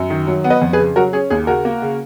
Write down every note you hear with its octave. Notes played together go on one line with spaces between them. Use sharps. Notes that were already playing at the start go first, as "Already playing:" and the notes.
Already playing: F#2
D#3
F#3
B3
B4 D#5
F2
G#4 B4
C#3
F#3 F#4 A#4
C#4 G#4
D#2 G#4
C#3 F#4 A#4
A#3
C#3